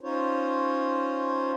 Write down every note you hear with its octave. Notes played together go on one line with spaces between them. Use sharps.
C#4 D#4 F4 C5 C#5